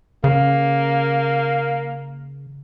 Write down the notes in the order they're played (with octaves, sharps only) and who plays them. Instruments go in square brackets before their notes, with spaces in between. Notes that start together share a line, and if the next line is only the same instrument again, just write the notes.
[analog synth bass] C#3 [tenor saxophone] A#3